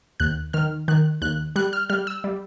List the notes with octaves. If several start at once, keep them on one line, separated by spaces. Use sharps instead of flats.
D#2 F#6
D#3 F6
D#3 F#6
D#2 F#6
G3 F#6
F6
G3 F6
E6
G3